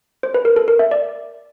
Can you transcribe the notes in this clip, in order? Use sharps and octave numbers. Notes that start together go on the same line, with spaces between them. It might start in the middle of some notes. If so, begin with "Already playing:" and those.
C5
B4
A#4
A4
A#4
E5
D5